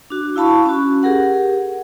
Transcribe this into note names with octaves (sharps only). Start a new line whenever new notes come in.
D4 F#4
E4 F5 A5 B5 C#6
C#4 F#4
G4 G#4 A#4 F#5